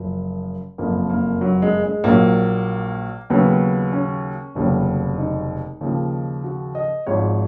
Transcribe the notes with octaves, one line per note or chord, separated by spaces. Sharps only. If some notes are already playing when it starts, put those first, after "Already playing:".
Already playing: F#1 F#2 F3
F#1 F2 F3 A#3
A#3
F#3
G#3
G#3
A#1 A#2 F#3 A#3
D#2 C#3 F#3 B3
C#4
F1 D#2 C#3 F#3
D#4
D#2 C#3 F3
F#4
D#5
G#1 G#2 F3 C#5